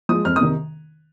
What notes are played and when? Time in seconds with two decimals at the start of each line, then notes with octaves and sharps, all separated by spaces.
0.09 F3 G#3 D#6
0.25 F2 F6
0.36 D#6
0.41 C3 D#3